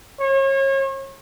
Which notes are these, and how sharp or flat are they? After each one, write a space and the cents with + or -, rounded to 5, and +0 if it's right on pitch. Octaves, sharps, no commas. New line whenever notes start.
C#5 -35